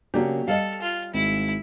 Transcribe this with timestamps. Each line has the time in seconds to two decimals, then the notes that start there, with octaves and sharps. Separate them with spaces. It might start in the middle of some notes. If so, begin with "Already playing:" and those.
0.14 C#3 F#3 A#3 C#4 D4 G4
0.48 G3 A4 D#5 F5
0.82 F4
1.14 G#1 E4